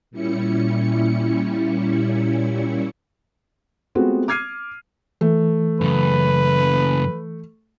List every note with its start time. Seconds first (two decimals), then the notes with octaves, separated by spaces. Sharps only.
0.11 A#2 G3 C#4 E4 C#7
3.95 G#3 A3 B3 C4 F4 F#4
4.28 D6 F6 G#6 C7 D#7
5.21 E3 A3
5.81 F#2 C#3 B4